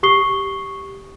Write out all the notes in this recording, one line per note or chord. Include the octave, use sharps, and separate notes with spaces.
G4 C#6 D#6 C7 G7